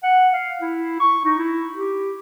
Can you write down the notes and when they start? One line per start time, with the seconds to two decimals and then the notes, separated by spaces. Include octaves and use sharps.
0.03 F#5
0.33 F5
0.61 E4
1.00 C#6
1.25 D#4
1.38 E4
1.76 G4